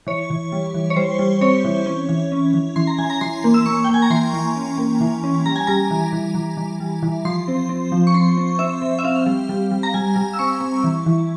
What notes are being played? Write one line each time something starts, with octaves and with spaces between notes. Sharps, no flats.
E3 C#5
E3
G3
E3
C#5
G3 C5
G3
C4 C#5
E3
C#4
E3
C#4
E3
E3 C6
A#5
E3 G#5
A#5
E3 C6
A#3
E6
A#3 C#6
G5
A#3 G#5
A#5
E3 C6
E3
C#4
A#3
E3
C#4
G3 A#5
G#5
G3 A#5
E3
E3
E3
E3
G3
E3
F3 C6
C4
C4
F3
C#6
C4 C6
C4
C4 E5
C4
E5
C4 F5
G3
G3
G3
A#5
G3 G#5
G3
E6
C4 C#6
C4
E3
E3